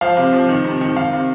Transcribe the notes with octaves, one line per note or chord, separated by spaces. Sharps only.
F3 F5
C3
F3
D#3
C3
D#3
D#3 F5
C3